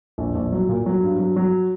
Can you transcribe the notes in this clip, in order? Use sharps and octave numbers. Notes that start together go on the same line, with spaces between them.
A#1
A#1
F#3
A#2
F#3
G2
F#3
F#3